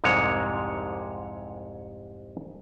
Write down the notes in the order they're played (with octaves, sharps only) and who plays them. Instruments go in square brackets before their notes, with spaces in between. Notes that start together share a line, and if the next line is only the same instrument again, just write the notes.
[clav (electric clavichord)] C2 F2 G#2 C3 G#3 C#5